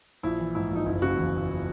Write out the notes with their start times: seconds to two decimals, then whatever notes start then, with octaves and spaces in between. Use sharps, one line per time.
0.23 A#1 E4
0.39 E3
0.55 G#2 E4
0.71 A#1 D#4
0.86 F#1 E4
1.02 C#3 F#4
1.17 E2
1.34 E3